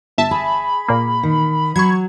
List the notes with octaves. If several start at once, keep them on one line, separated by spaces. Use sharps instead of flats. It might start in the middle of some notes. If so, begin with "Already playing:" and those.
G1 E5 A5
G#4 B5
A#2 A#3
D#3
F#3 C#6 G#6